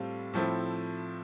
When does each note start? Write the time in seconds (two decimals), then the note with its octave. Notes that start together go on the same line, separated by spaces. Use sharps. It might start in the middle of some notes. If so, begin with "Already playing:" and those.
Already playing: A2 G3 C4 F4 A4
0.33 A2 F3 C4 E4 A4